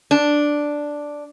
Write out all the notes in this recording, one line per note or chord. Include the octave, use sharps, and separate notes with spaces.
D4